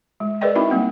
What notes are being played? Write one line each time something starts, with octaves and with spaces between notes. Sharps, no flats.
G#3
G#4 A#4 B4 D5 D#5 G5
C4 D#4 E4 F#4 E5 B5
G3 A#3 C4 F#5